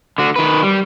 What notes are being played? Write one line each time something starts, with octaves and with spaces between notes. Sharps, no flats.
D3 F#4
D#3 B4
G3